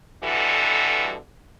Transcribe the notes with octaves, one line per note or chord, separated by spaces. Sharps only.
B2 D3 E3 G3 F#4 A4